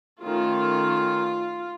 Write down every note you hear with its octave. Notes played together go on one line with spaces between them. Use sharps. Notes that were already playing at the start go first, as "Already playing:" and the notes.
D#3 A3 C#4 F4